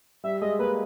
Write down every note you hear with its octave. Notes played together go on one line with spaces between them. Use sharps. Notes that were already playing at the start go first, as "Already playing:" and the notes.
G3 E5
G#3 D#5
A#3 B4